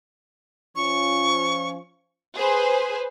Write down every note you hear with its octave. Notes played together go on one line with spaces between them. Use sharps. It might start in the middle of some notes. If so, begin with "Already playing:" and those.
F3 C#4 C#6
G#4 B4 C5